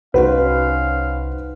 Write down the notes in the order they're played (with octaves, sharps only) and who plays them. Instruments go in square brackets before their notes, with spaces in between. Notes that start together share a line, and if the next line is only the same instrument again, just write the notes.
[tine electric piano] C2 D#4 C5 [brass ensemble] C#4 F5 [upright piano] F#4 B4